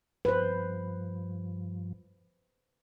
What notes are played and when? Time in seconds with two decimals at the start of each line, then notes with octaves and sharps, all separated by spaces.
0.25 G2 F3 B4 C5